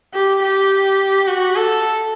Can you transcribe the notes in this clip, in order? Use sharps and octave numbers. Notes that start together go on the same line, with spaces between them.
G4
G4
F#4
A4